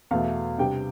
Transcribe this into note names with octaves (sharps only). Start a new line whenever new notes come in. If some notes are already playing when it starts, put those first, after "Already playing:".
E2 B2 A3 F5
C3 G3 D4 G5